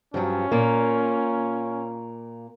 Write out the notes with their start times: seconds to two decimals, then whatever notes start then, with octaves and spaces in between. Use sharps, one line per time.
0.14 G2 F3 F#3 C#4
0.52 A#2 A#3